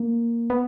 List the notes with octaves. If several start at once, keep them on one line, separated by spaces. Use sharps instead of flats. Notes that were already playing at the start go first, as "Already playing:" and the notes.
Already playing: A#3
B3